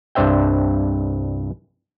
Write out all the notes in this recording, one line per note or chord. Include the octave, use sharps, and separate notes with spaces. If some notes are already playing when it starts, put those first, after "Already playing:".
C2 G2 D4 C5 E5 G5